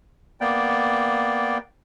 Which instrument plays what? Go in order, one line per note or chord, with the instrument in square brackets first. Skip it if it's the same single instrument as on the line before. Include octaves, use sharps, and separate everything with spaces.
[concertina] A#3 B3 D5 G5